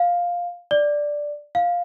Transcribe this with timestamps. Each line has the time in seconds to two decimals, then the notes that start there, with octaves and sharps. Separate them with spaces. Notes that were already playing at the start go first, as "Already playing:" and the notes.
Already playing: F5
0.71 D5
1.55 F5